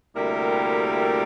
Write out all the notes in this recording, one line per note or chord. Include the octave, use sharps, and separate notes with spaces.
D2 C3 G3 A#3 E4 A#4